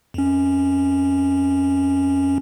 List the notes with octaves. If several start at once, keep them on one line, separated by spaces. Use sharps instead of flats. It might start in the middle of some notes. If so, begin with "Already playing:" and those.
F2 C#4